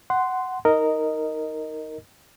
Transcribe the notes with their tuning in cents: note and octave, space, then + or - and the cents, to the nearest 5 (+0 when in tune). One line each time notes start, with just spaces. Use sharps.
F#5 +10 C6 -10
D#4 +15 A#4 -10 D#5 +0